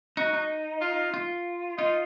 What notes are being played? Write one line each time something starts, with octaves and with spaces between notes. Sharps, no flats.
D#4 F#4
D#4
F4
F4
D#4 F4